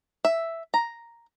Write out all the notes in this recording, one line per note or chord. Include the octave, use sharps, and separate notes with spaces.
E5
A#5